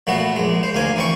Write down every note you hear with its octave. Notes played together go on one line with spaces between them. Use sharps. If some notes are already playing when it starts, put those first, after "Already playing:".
A#2 A3 B3 F#4
A#1 G#3
C5
D2 A#3 G#5
E3 C4 C#6